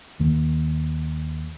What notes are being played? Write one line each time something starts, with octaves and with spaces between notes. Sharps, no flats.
D#2 D#3 A#3